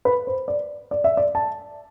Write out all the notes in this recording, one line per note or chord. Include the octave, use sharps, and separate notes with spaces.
B4
C5
D5
D5
E5
D5
A5